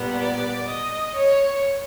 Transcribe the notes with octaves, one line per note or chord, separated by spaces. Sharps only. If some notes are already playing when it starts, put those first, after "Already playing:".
Already playing: A#2 G3 B3
D5
D#5
C#5